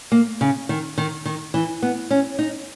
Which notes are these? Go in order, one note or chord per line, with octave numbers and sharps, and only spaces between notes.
A#3
C#3
D#3
D#3
D#3
E3
B3
C#4
D#4